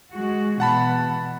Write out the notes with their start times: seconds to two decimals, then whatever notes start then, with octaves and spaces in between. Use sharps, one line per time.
0.14 G#3 F#4
0.60 B2 E3 F#5 A5 B5